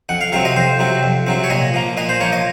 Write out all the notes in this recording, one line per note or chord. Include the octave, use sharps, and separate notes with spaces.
F2 F#5
F5
C3 F#3 C4 F5
D#5
F2 C5
C3 F#3 C4
F2
C3 F#3 C4
C#5
A#2 D#5
F3 A#3
A#2 D#5
C5
F3 A#3 C#5
D#5